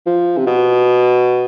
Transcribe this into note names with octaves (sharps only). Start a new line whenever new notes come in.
F3
C3
B2